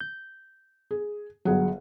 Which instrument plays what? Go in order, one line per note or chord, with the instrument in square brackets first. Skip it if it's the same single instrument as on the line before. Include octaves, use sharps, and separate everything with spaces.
[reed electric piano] G6
[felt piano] G#4
[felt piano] G1 G#4 F#5 [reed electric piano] F#3